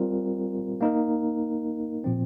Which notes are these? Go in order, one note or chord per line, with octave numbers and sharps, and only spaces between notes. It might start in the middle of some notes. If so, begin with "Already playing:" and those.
Already playing: G3 C4 F4 A#4
A#3 D#4 A#4
A#2 F3 C4